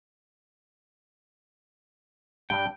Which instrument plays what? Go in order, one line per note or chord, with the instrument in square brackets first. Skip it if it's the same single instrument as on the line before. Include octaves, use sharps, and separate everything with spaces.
[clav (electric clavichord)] G2 D4 [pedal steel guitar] G5